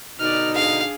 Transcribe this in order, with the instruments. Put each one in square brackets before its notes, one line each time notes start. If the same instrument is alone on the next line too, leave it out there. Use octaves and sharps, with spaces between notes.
[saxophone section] B2 D3 D#4 [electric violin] D5 F6
[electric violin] D4 G#4 [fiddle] F5